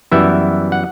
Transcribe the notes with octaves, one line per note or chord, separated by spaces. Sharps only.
F#2 E3 G3 B3 E4 E5
F#5